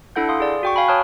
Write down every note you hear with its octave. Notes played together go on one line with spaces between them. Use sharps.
D4 E4 A4 F#5 G6
F5 C6 D#6
G#4 D5
F#4 G5 C#6
F5 G#5 B5
C#5 A5 D#6 F6 F#6